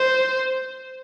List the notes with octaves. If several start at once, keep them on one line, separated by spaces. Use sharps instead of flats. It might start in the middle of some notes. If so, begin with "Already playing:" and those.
Already playing: C5